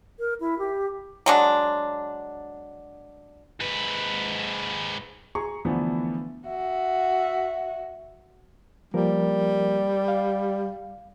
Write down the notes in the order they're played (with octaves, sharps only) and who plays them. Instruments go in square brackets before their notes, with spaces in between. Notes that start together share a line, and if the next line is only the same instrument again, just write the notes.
[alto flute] A#4
E4
G4
[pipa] F#3 G#3 D4
[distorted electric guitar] G#2 B4
[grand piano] G#4 A#5 C#6
D3 E3 F3 A3 B3
[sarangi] F#4 [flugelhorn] E5
[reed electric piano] F3 A#3 A#4 [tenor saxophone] G3
[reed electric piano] F5